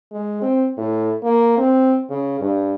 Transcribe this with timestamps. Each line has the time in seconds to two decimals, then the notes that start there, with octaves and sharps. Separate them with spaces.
0.12 G#3
0.42 C4
0.77 A2
1.23 A#3
1.57 C4
2.10 C#3
2.40 G2